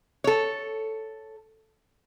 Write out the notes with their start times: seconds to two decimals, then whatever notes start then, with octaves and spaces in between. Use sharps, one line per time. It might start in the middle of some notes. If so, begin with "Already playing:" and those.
0.24 A4 C#5